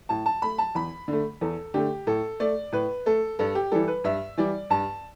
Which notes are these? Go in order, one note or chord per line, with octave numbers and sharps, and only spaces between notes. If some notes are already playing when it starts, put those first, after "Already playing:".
A2 A5
A5
A3 B5
A5
E2 B5
D3 A3
E2 A4
D3 A3 G4
A2 A4
A3 D5
A2 B4
A3 A4
G2 A4
G4
E3 G3 A4
B4
G2 E5
E3 G3 D5
G2 A5